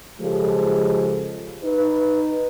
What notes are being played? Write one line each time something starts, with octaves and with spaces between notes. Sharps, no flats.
C#3 F3 G#3 G4 A4
D#4 B4